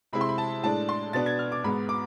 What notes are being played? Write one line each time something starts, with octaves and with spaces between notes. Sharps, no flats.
C3 G#3 C4 E4 B5
C6
B5
A5
A2 G#3 D4 A5
C6
B2 B3 D4 A6
G#6
F6
D6
G#2 G#3 B3 B5
D6